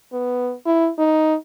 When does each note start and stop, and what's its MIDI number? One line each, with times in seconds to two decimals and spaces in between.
0.13 0.53 59
0.66 0.89 64
0.98 1.35 63